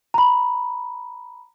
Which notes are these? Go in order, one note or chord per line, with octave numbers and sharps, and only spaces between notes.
A#5 B5